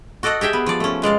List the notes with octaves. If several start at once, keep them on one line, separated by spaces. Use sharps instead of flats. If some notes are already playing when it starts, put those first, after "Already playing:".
F#4 A4 D5 D#5 F#5
G4 G#4 E5 G5
B3
F3 D5
A3 C#4
B2 G#3 D5 F5